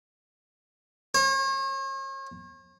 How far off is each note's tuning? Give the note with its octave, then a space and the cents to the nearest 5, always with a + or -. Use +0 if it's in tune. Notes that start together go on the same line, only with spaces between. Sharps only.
C#5 -45